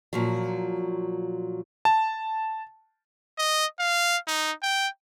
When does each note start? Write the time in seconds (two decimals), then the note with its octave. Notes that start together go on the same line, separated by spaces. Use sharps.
0.13 A#2 F3 F#3
1.85 A5
3.39 D#5
3.80 F5
4.28 D#4
4.63 G5